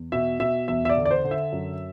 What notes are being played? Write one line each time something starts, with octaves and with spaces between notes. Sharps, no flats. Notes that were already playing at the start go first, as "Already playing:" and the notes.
Already playing: E2
B2 E5
B2 E5
E2 E5
E5
D5
D3
D5
C5
D3
E5
F#2